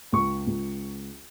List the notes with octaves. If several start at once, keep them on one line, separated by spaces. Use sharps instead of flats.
C#2 C#6
C#2